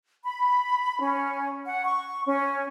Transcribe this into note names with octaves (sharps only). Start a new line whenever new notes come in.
B5
C#4
F#5
C#6
C#4